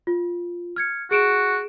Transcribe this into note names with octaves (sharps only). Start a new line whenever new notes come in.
F4
F6 G#6 C#7
F#4 G#4 D7 E7